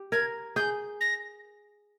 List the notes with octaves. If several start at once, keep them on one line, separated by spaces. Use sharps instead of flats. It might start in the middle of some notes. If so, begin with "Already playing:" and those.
Already playing: G4
A#4 G#6
G#4 G6
A#6